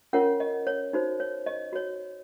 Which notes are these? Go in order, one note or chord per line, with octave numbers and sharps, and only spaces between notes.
C#4 F4 A#4 C#5 F#5
D#5
C#5
D#4 F#4 C5
C#5
D#5
F#4 C#5